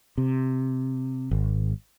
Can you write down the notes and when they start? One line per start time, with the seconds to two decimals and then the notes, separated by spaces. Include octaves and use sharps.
0.18 C3
1.31 G#1